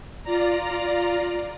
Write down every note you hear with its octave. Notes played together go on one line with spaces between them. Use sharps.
F4 D5 A#5